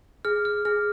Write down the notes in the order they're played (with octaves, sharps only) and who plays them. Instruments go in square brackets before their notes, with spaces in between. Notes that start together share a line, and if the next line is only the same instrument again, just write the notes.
[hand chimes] G#4 [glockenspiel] F6
[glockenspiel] F6
[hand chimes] G#4 [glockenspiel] F6